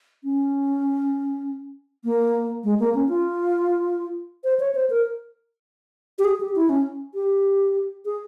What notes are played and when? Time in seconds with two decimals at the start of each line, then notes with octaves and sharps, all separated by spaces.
0.24 C#4
2.04 A#3
2.64 G#3
2.80 A#3
2.95 C#4
3.09 F4
4.44 C5
4.60 C#5
4.75 C5
4.90 A#4
6.19 G4
6.25 G#4
6.41 G4
6.56 E4
6.69 C#4
7.14 G4
8.05 G#4